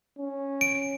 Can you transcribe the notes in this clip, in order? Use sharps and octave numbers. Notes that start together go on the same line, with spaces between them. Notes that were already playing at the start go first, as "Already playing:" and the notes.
C#4
D7